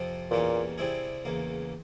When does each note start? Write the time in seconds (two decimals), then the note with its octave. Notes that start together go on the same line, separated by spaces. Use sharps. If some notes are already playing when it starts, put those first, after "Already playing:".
Already playing: F2 C3 F3 C4
0.31 E2 A#2 E3 G3 A#3 C#4
0.78 C3 G3 C4 E4 G#4
1.25 E2 C#3 E3 A#3